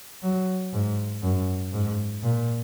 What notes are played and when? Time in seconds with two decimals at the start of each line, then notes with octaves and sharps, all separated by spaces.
0.23 F#3
0.73 G#2
1.23 F#2
1.73 G#2
2.24 A#2